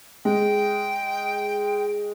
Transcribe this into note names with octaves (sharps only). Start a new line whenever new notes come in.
G#3 G5